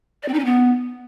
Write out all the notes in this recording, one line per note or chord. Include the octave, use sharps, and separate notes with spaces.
D5
C4
D#4
C#4
B3